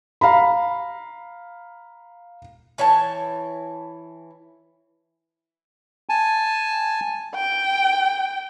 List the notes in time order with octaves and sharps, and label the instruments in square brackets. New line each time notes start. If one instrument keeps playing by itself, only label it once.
[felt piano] F5 A#5 B5
[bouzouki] E3 C#5 G5 A5
[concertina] G#5 A5
[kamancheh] G5